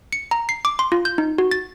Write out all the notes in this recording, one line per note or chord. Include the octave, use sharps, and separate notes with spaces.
C#7
A#5
C7
D6
C6
F4
G6
D#4
F#4
A6